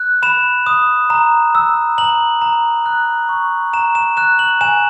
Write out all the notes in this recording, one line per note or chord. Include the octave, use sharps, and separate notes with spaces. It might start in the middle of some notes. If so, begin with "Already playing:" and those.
Already playing: F#6
B5 E7
D#6
A#5
E6
A#5 F#7
A#5
F#6
C#6
A#5 E7
E7
F#6 E7
F#7
G#5 E7